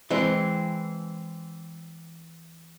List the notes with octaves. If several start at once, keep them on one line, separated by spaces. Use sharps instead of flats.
E3 G#3 C4